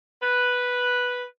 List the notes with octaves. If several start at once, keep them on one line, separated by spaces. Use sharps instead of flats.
B4